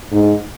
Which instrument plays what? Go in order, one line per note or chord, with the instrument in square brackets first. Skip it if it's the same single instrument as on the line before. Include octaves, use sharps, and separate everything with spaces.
[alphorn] G#2